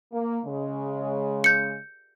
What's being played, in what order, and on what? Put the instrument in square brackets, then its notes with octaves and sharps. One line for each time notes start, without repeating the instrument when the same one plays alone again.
[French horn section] A#3
C#3 G#3
[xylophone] G6 C#7